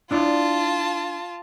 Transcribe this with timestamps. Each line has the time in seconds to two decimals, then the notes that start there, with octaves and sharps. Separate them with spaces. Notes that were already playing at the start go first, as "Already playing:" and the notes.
0.11 D4 E4 F4 D5 A5